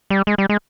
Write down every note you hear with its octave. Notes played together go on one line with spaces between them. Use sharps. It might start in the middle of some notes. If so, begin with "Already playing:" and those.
G3
G#3
G3
G#3